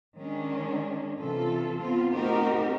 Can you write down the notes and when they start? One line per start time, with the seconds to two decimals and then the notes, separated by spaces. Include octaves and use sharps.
0.19 D#3 G#3 C#4 D4
1.20 C3 E3 F4 A4
1.79 B3 C4 F4
2.14 A3 C4 D#4 F#4 G4 A#4